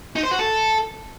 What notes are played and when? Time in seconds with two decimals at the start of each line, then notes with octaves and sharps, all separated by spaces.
0.16 D#4
0.23 C5
0.31 F#4
0.39 A4